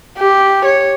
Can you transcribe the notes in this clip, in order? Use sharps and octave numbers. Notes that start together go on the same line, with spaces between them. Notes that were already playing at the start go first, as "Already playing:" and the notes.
G4
C#5